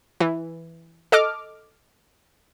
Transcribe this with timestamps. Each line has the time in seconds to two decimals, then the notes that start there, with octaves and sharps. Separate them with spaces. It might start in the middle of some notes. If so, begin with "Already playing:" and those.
0.20 E3
1.12 A4 D#5 D6 F6